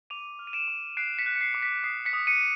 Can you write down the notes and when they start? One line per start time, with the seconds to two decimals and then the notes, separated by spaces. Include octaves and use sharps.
0.10 D6 D#7 F7
0.39 F6
0.47 D#7
0.53 D7 E7
0.68 D6
0.97 F#6 C7 D7
1.18 B6 C#7
1.26 F#6
1.36 C#7
1.41 C7
1.54 D6
1.63 B6
1.84 D#6 C7
2.05 B6 C#7
2.13 D#6
2.27 C#7 D#7